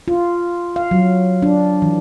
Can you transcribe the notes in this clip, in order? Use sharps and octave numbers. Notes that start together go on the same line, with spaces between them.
F4
F5
F#3
D4
E3